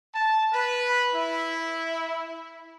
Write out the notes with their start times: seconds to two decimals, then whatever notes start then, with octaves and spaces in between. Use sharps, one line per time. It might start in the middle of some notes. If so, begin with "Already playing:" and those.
0.14 A5
0.52 B4
1.12 E4